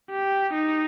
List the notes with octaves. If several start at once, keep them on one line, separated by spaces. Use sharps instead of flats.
G4
D#4